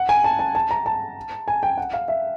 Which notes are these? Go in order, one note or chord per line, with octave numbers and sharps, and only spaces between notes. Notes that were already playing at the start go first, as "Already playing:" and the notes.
Already playing: F#5
G#5
A5
A5
A5
A#5
A5
G#5
G5
F#5
F5
E5